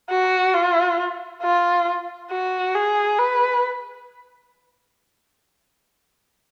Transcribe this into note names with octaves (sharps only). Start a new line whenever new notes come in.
F#4
F4
F4
F#4
G#4
B4